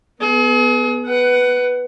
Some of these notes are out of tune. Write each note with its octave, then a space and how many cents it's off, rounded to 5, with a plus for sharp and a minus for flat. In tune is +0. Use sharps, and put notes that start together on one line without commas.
B3 +0 G#4 +40
B4 +0 F#5 +20